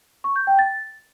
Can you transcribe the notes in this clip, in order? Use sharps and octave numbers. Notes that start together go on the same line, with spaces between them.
C#6
G6
G5
A6